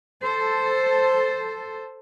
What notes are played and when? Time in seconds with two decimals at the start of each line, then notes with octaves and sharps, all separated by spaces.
0.24 A4 C5